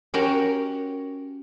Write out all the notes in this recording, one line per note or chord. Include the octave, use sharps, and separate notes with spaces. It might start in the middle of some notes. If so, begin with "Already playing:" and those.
C#4 F#4 G4 A#4 C#5 A#5